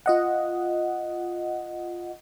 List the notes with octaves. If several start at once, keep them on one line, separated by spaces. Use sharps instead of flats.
F4 D#5 F#5